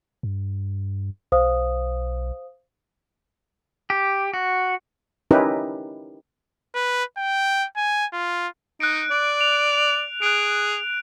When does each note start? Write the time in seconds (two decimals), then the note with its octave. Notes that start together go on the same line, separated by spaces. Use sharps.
0.23 G2
1.32 B1 C5 F5 D#6
3.90 G4
4.34 F#4
5.31 C#4 D#4 E4 G4 A#4 B4
6.75 B4
7.18 G5
7.77 G#5
8.13 F4
8.80 D#4 F#6 D7
9.11 D5
9.41 F7
10.22 G#4 F#6 D7